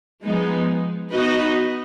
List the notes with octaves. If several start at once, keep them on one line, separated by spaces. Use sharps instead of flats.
F3 G#3 B3 D#4
B3 D#4 F#4 B4 D#5